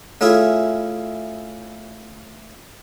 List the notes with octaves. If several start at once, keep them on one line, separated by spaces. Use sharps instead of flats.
A3 C#4 E4 F4 G#4